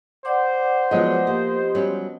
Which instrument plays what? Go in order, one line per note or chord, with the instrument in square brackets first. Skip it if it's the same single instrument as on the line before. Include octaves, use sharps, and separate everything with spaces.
[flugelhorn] C5 [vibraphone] D5 F#5 D6
[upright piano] F3 B3 D#5 [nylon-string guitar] F#3 G#3
[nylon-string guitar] A#3 [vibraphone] G4
[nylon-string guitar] F#3 G3 C#4